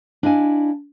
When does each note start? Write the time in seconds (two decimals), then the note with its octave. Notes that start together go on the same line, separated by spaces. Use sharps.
0.23 D4 E4 D#5 F5 G#5